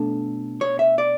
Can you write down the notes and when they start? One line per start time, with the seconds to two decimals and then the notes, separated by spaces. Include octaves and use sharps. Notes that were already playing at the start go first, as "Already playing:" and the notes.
Already playing: B2 A3 D4 A4
0.61 C#5
0.79 E5
0.98 D5